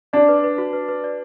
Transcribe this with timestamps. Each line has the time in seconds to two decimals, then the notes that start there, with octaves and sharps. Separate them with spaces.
0.13 D4 D5
0.28 B4
0.44 B4
0.58 F#4
0.73 B4
0.88 B4
1.04 D5